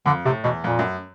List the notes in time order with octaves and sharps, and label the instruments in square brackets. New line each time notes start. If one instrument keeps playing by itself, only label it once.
[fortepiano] F2 [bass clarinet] D3
[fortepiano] A2 [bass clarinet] C3
[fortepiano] E2 [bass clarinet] B2
[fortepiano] F2 [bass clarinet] A#2
[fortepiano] F#2